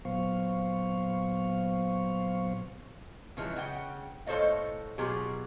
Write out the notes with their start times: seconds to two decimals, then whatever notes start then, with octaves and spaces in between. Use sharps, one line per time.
0.05 A#2 F#3 B3 C5 F5 C#6
3.37 C#3 E3 F3 G#3
3.56 C#3 F#5 G5
4.26 A2 A4 C5 C#5 D#5 F5
4.98 B2 F#3 F4 G4 G#4